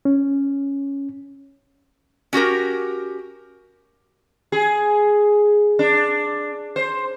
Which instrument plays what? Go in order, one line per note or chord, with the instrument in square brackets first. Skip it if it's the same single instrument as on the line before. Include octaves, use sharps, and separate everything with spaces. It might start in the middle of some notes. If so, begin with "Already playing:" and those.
[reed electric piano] C#4
[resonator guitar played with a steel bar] C#4 F#4 G4 A#4
[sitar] G#4
D4
C5